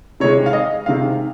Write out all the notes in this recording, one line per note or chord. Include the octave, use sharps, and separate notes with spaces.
C3 D#3 G#3 C#5
F5
D#5
C3 D#3 G#3 F5